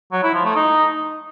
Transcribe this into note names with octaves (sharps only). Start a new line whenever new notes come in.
F#3
E4
F3
A3
D#4